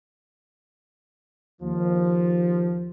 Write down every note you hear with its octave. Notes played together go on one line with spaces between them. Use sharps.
D#2 F3